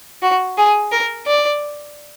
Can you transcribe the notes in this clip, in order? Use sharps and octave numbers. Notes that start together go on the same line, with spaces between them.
F#4
G#4
A#4
D5